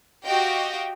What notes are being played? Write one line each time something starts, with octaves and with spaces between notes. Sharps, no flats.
F#4 G4 D#5 F5 G5